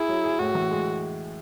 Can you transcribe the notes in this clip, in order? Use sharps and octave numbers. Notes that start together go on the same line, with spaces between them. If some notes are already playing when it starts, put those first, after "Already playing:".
Already playing: E4 G#4
F#3
G#4
A2 F#4
E3
G#3